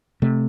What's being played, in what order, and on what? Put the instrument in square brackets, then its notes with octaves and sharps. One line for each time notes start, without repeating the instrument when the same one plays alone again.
[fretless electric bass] C3 A3